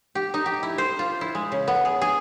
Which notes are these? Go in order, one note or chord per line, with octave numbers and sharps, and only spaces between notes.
G4
D#4
G4
E4
C5
F4
E4
G#3
C#3
B3
G#4
G#4